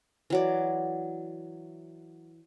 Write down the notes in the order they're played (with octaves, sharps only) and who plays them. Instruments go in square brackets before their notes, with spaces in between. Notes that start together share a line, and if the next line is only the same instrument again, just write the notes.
[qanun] E3 F#3 D5